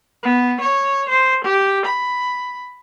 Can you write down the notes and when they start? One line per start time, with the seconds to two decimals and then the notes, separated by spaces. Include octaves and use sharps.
0.23 B3
0.61 C#5
1.09 C5
1.44 G4
1.86 B5